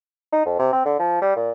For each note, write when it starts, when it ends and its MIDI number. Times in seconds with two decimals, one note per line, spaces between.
0.33 0.45 63
0.46 0.54 41
0.59 0.69 48
0.73 0.82 60
0.85 0.97 50
0.99 1.18 53
1.22 1.35 55
1.36 1.51 46